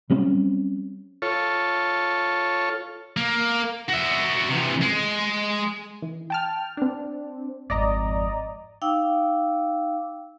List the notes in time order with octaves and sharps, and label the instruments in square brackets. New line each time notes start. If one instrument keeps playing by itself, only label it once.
[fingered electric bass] F#3 G3 C4 C#4
[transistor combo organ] F4 A4 C#5
[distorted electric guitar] A#3
F#4 E5
C3 E3
G#3
[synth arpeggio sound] E3
G5 A5 F6
C4 D4
[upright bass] G#1 F2 [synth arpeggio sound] D5 D#5 A#5
[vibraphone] D#4 F5 G5 D6 E6